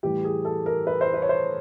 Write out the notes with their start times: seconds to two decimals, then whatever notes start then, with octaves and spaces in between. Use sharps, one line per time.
0.03 A2 E3 G3 G4
0.24 G#4
0.45 A4
0.66 A#4
0.87 B4
1.01 C5
1.14 B4
1.22 C#5
1.29 C5